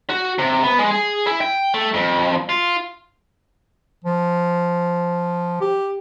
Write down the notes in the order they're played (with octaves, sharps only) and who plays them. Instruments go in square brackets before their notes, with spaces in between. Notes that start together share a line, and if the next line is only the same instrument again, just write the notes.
[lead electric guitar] F#4
C3
B3
G#3
G#4
E4
G5
A3
F2
F4
[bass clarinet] F3
G4